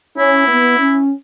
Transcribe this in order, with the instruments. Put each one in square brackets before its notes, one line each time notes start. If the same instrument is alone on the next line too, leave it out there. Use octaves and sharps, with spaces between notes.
[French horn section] C#4 [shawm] E4
[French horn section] B3
C#4